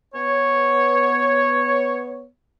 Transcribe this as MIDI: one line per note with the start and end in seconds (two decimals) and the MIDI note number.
0.14 2.27 59
0.14 2.27 73